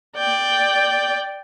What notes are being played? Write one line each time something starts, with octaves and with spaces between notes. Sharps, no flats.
D5 G5